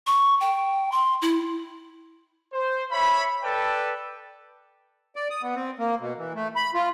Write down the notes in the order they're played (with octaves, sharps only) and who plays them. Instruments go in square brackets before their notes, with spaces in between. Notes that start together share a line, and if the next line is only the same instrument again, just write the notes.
[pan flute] C#6
G5
C6
E4
[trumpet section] C5
C#5 E5 B5
A4 B4 D5 G5 A5
[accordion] D5
D#6
B3
C4
A#3
B2
E3
A3
B5
F4